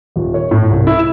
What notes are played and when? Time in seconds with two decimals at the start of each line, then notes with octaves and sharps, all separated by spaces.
0.16 D#1
0.34 C#5
0.51 A2
0.70 C2
0.87 E4
0.99 E7